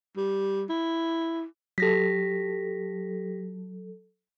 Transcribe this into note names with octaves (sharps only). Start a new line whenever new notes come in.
G3
E4
F#3 G4 A4 A#6 B6